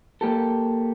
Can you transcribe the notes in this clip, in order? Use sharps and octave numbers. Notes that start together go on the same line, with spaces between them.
A#3 G4 A4